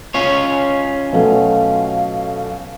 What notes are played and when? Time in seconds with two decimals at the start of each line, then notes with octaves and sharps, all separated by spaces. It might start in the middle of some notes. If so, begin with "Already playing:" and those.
0.14 C#4 F4 C#5
1.13 B2 F#3 A3 F5